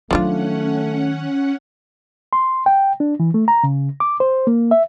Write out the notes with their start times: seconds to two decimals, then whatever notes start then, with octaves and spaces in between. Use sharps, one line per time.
0.11 D#3 F3 F#3 A3 C#4 D4 F4 F#5
2.33 C6
2.66 G5
3.00 D4
3.20 E3
3.34 A3
3.48 A#5
3.64 C#3
4.00 D6
4.20 C5
4.47 A#3
4.71 E5